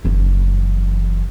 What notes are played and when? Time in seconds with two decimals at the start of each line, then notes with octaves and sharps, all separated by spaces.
0.04 F#1 E3